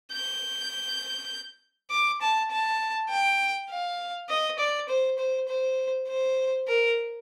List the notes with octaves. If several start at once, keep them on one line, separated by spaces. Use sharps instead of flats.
G6
D6
A5
A5
G5
F5
D#5
D5
C5
C5
C5
C5
A#4